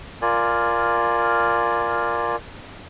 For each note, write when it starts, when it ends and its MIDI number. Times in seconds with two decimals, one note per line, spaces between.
0.22 2.36 65
0.22 2.36 70
0.22 2.36 74
0.22 2.36 80